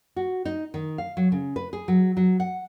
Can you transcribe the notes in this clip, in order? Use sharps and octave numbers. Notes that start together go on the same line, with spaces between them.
F#4
D#4
D#3
F5
F#3
C#3
B4
G#4
F#3
F#3
F#5